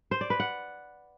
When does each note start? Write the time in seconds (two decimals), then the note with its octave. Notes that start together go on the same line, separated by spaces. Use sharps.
0.11 C5
0.21 D5
0.30 B4
0.40 F#5